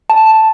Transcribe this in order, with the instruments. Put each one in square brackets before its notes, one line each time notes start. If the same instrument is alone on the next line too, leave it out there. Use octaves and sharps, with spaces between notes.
[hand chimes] A5